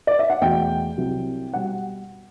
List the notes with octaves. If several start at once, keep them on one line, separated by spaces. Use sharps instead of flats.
D5
E5
F#5
E2 B2 A3 G5
C2 C3 F#3
B2 G3 F#5